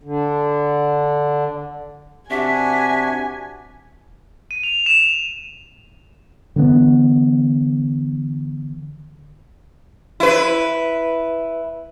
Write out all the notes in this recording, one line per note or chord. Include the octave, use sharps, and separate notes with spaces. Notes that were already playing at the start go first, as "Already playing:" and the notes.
D3
C3 D4 F#4 E5 G#5
D#7
F7
E7
D3 E3 G#3 B3
E4 B4